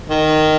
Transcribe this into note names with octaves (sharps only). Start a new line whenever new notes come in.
D#3